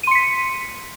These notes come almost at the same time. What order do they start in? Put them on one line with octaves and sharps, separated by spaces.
D#7 C6 C#7 B6